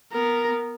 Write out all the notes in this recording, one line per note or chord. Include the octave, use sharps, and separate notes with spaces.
B3 A#4